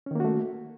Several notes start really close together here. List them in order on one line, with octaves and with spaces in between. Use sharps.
C#4 D#3 A#3 F#4 A3